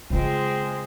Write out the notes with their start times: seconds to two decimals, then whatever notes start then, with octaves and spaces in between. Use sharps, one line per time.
0.10 C#3 G#3 C4 F4